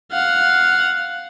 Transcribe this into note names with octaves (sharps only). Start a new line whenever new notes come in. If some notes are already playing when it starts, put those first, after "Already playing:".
F5 F#5